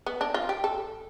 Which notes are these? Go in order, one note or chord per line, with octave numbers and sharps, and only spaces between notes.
B3
D4
F4
G4
A4